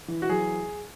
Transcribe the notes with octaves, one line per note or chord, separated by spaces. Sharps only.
E3
F#4
F#3 G#4